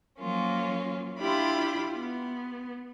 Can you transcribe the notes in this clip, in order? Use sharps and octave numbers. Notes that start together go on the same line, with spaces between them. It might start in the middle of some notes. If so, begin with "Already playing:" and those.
F3 F#3 A#3 C#4 F4
D4 E4 F4 G4 B5 C6
B3